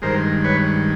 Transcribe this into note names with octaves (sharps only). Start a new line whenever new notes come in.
G2 D#3 G#3 A#4 C5
B4 C#5